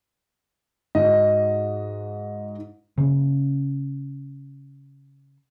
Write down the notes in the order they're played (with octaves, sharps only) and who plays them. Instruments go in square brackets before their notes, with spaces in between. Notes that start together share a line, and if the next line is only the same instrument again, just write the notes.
[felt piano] G#2 F#4 [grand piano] D#5
[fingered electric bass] C#3 A#3 C#4